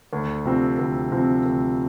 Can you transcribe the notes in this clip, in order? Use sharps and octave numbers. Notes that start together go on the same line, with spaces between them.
D2
C3 F3 C4
D2
C3 F3 C4
D2